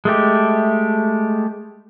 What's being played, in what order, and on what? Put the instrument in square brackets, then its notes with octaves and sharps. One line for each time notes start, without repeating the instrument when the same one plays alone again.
[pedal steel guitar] G#3 A3 G4